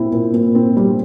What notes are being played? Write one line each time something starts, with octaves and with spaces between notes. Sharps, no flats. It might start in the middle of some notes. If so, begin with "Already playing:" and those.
Already playing: A#2 C4 E4
A#2
A#2
C4
G3